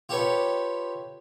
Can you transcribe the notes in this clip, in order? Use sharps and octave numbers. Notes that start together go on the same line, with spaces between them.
F4 G4 A4 B4 C#5